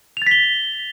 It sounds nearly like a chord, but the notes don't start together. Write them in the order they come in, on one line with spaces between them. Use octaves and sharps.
F7 A6 B6 G7